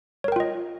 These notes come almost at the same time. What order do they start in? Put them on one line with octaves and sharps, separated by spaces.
C#5 A#4 G5 F4 D#5